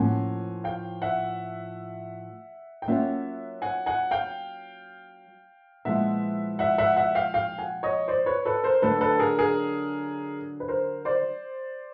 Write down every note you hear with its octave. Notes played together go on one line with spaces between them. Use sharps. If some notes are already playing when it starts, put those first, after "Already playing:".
Already playing: A2 F3 A#3 C#4 F#5 G#5
F5 G5
E5 F#5
G5
F#3 A#3 C#4 F4 E5 F#5
F#5 G#5
F#5 G#5
F5 G5
A#2 F3 G#3 B3 E4 E5 F#5
E5 F#5
E5 F#5
E5 F#5
F5 G5
F5 G5
F#5 G#5
C#5 D#5
C5 D5
B4 C#5
A4 B4
A#4 C5
D3 F#3 A3 A4 B4
A4 B4
G#4 A#4
G#4 A#4
B4
A#4 C5
C5 D5